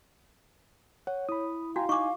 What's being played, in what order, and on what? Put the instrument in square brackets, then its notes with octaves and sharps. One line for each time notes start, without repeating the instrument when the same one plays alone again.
[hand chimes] C#5 [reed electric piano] F#5
[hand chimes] E4 [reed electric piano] B5 D#6
[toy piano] F#4 [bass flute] F5 [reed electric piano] G5 G#5 A#5
[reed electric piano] D#4 G#5 [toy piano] C#6 D6